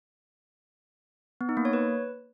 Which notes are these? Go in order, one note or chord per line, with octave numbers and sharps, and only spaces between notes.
B3
D#4
A#3
C#5
B4